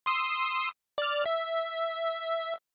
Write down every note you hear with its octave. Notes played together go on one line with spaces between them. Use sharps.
C6 D#6 E6
D5 F6
E5